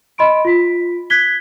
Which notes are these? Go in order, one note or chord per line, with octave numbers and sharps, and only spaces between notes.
D#5 B5 C6 D7
F4 B6
F#6 G#6 B6 G7